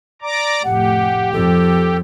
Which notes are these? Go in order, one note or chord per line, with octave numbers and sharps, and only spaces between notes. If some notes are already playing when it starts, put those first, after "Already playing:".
D5 A#5 D6
F1 A2 G4 F#5
F2 A4